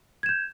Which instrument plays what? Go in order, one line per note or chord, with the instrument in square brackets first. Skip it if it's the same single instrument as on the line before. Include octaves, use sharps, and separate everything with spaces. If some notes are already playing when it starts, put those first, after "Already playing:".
[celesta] G#6
E7
G6